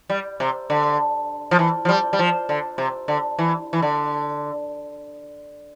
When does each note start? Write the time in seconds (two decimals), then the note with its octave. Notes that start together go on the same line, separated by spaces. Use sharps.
0.10 G3
0.40 C3
0.70 D3
1.51 F3
1.59 E3
1.85 F3
1.89 G3
2.13 G3
2.19 F3
2.49 D3
2.78 C3
3.08 D3
3.39 E3
3.73 E3
3.82 D3